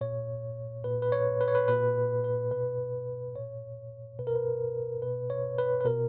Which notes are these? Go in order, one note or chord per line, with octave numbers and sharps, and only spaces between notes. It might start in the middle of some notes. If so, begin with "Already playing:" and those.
A#2 C#5
A#2 B4
B4
C#5
B4
C#5
B4
A#2 B4
B4
B2 B4
A#2 C#5
B2 B4
A#4
B4
B2 B4
C#5
B4
B4
B2 A#4